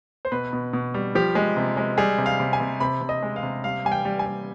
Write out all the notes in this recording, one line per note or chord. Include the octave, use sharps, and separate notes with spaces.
C5
B2 B4
B2
B2
G3
F3 G4
G#3
C3
G#3
G3 G#4
C3
F5
C3
G#5
C3
C3 B5
C3
D#5
G#3
F5
C3
G3 F5
G3 G#5
G5
G3
G#5
G3